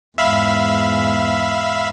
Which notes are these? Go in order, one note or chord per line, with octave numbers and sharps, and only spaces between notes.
E2 G#2 E5 F5 B5